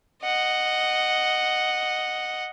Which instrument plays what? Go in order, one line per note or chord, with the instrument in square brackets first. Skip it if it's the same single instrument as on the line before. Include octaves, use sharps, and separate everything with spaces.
[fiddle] D#5 F#5